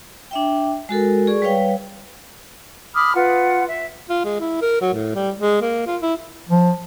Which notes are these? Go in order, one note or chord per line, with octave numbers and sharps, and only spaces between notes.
D4 E5 G5
G#3 F#4 A4 A#4
G#4 D5 C#6
G3 B4 C#5 F5 G5
B5 D6 D#6 F6
F4 B4 F#5
E5
F4
G#3
E4
A#4
F#3
A2
G3
G#3
A#3
F4
E4
F3